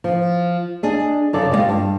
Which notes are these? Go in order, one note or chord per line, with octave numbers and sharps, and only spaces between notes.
F3
D4 G#4 D#5
F#2 C#3 A4 D5
G3 G#3 E4 F4 G4
G2